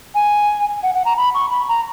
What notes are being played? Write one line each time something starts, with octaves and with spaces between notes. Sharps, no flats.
G#5
F#5
F#5
A#5
B5
C#6
B5
A#5